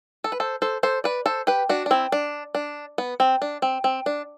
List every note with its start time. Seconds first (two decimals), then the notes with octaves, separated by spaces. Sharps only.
0.24 A4
0.32 B4
0.40 A4 C5
0.62 A4 C5
0.83 A4 C5
1.04 B4 D5
1.26 A4 C5
1.47 G4 B4
1.69 D4 F#4
1.86 D4
1.91 C4 E4
2.12 D4
2.55 D4
2.98 B3
3.20 C4
3.42 D4
3.62 C4
3.84 C4
4.06 D4